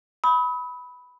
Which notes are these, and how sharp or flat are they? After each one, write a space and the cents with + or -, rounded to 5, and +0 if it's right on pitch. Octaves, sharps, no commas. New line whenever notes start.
B5 +0 D#6 +45